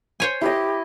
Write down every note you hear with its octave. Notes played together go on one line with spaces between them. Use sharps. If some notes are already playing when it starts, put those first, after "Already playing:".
C5 C#5 G#5
E4 G4 D#5